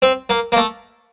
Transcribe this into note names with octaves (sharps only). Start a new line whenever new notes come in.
C4
A#3
A#3
A3